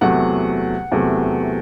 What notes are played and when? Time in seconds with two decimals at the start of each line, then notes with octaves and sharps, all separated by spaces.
0.01 E2 C3 F#3 A3 F#5
0.91 E2 C3 F#3 A3